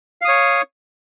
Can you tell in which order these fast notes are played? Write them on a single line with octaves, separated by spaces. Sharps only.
F5 D#6 C#5